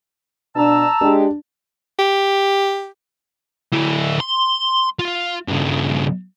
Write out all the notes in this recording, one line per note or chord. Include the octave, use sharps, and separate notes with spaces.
B2 D4 A5 A#5 E6
G#3 D4 G4
G4
D3 E4
C6
F4
G2 C#3